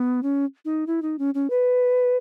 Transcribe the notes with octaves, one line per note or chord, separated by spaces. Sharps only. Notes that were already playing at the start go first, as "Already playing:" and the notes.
Already playing: B3
C#4
D#4
E4
D#4
C#4
C#4
B4